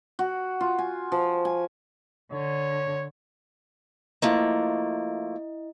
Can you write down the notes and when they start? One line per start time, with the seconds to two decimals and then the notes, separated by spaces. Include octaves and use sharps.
0.19 F#4
0.61 F4
0.78 G#5
1.12 F3
1.45 G#5
2.32 D3 C#5
4.22 F3 A3 A#3 E4 D#5